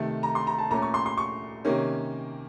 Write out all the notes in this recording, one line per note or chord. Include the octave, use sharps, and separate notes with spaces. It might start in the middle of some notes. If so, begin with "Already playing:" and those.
Already playing: C3 D#3 A3
A#5
C6
A#5
A5
A#2 A3 C#4 A#5
C#6
C6
C6
C#6
C3 D#3 A#3 C#4